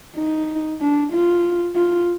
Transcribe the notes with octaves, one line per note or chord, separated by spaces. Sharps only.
D#4
D4
F4
F4